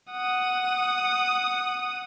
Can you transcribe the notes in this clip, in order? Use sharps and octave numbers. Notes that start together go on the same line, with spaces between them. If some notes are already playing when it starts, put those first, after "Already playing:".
F#5 D#6